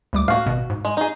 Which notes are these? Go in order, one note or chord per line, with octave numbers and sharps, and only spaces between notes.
D2 G3 D6
A2 A#3 F#4 F5
G#1 B2
G#2
G#3
D#4 G#4